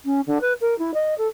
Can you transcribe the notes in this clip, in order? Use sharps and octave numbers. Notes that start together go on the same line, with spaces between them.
C#4
D3
B4
A#4
E4
D#5
A4